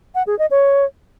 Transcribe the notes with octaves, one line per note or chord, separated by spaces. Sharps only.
F#5
G#4
D#5
C#5